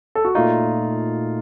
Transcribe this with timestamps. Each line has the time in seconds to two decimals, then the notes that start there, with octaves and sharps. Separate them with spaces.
0.15 A4
0.25 F#4
0.35 A#2 A3 D#4 F4